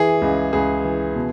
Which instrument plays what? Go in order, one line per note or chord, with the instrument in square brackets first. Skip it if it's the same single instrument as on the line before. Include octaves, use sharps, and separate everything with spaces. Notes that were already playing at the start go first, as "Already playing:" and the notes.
Already playing: [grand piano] E3 G#4
C#2
C#2 G#4
E3
B2